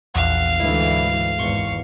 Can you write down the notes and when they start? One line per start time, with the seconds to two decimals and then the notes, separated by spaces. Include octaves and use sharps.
0.15 A#1 E2 F5 F#5
0.60 D2 G#2 E3 E4
1.39 G#1 E2 C6 C#6